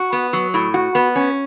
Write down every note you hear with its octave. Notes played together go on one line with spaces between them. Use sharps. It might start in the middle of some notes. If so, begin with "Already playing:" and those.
Already playing: F#4
B3
F#3
A2
F#4
B3
C#4